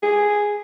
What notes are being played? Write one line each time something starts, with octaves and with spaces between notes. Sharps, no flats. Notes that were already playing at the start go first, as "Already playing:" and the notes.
G#4